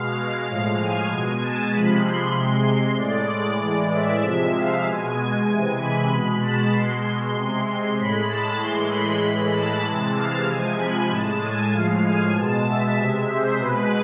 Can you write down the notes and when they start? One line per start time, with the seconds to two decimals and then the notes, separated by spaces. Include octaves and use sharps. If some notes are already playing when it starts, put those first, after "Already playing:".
Already playing: B2 G#3 F5
0.16 F5
0.47 A2 F3 G#3
0.79 G#5
1.10 B2 G#3
1.41 A5
1.72 C3 F3 G#3 B5
2.03 C6
2.34 C3 G#3
2.66 C6
2.97 A2 G#3 D5
3.60 A2 E3 G#3
3.92 E5
4.22 C3 F3 G#3
4.54 F5
4.85 B2 G#3 G#5
5.48 C3 E3 G#3 G#5
5.78 B5
6.10 B2 G#3
6.41 A5
6.73 B2 G#3 C6
7.35 C3 G#3 C6
7.66 C6
7.97 A2 G#3 B5
8.28 A5
8.60 A2 E3 G#3 C6
8.91 B5
9.23 A2 E3 G#3
9.53 A5
9.85 C3 E3 G#3 A5
10.17 F5
10.47 C3 F3 G#3 G#5
10.79 B5
11.10 A2 G#3 A5
11.41 G#5
11.72 A2 F3 G#3 F5
12.04 G#5
12.35 B2 G#3 A5
12.66 E5
12.98 C3 G#3
13.29 C5
13.60 B2 G#3 B4